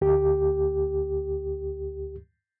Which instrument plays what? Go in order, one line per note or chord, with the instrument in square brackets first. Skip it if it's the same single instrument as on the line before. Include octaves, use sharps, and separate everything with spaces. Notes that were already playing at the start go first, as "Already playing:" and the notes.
[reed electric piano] D2 G4